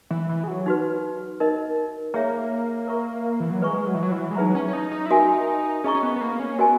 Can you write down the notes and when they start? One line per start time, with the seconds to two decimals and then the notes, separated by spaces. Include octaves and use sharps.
0.11 E3
0.29 E3
0.43 G#3
0.48 F#3
0.66 D#4 F#4 B4
1.40 D#4 A#4 D#5
2.14 A#3 G#4 C#5 E5 A#5
2.87 A#4 E5 A#5 C#6
3.40 E3
3.51 F#3
3.62 G#3 B4 E5 A#5 C#6
3.87 F#3
3.95 E3
4.03 F#3
4.12 E3
4.31 G#3
4.36 F#3 D#4 G#4 B4 E5 A#5
4.55 C#4
4.68 C#4
4.73 D#4
4.92 D#4
5.06 E4
5.10 D#4 F#4 A#4 E5 G#5
5.84 C#4 G#4 D#5 A#5 C#6
5.95 C#4
6.03 B3
6.16 B3
6.21 A#3
6.39 C#4
6.58 B3 F#4 A#4 D#5 G#5